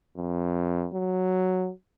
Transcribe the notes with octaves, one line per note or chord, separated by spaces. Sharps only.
F2
F#3